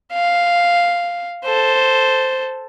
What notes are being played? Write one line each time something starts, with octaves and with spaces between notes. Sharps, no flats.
F5
A4 C5